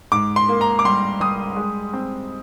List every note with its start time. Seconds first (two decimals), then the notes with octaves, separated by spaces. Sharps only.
0.12 G#2 D6
0.36 C6
0.49 A#3
0.61 A#5
0.79 D6
0.85 G3 C6
1.20 G3 D#6
1.56 G#3
1.94 C4